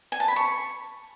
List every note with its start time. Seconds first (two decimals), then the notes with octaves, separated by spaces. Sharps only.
0.12 G#5
0.20 A5
0.28 B5
0.36 C#6